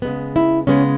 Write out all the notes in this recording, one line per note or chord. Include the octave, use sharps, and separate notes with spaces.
C#3 G#3 B3
E4
C#3 G#3 B3 C#4